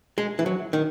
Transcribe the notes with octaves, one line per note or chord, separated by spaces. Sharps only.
G#3
E3
F#3
D#3